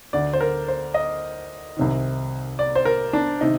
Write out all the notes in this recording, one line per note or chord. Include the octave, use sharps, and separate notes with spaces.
D2 D3 D5
C5
A#4
C5
D#5
C2 C3 D#3
D5
C5
A#4
D4
C3 D#3 D#4